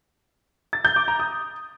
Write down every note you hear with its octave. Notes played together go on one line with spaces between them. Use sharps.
A6
G6
D6
A#5
D#6